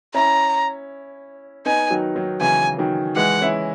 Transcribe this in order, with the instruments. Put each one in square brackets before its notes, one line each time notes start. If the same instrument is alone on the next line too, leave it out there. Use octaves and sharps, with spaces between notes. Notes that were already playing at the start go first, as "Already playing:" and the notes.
[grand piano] C#4 E4 [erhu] A#5
[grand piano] B3 D#4 [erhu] G#5
[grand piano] D#3 F#3
D#3 F#3
[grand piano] C#3 E3 [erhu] G#5
[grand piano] D#3 F#3
[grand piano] E3 G#3 [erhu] F#5
[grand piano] C#4 E4